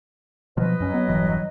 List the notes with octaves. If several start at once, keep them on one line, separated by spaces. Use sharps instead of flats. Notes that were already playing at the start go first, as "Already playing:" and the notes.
B2 F3 F#3 B4 D#5
F#2 F#3 C#4
B3
E1 G2 E3